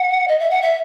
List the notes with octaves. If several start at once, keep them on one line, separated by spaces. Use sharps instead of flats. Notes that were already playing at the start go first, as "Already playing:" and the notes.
Already playing: F#5
D#5
E5
F#5
E5